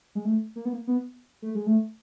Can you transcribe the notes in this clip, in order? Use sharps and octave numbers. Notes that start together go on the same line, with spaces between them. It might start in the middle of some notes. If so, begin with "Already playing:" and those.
G#3
A3
A#3
B3
A#3
B3
A3
G#3
A3